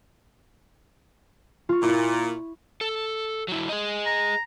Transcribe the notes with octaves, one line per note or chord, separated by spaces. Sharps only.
F4 C#6
A#2 E4 B6
A4
F#3 E4
G#4 D#5
A#5